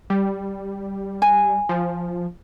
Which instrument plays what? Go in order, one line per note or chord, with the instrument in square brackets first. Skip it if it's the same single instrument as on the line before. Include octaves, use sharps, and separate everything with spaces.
[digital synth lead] G3
[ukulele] G#5
[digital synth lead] F3